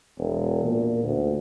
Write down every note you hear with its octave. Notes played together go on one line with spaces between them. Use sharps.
E1
A#2
D2